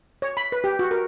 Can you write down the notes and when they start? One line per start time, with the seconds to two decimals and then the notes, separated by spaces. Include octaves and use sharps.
0.22 C#5
0.37 B5
0.52 B4
0.64 G4
0.79 F#4
0.91 A#4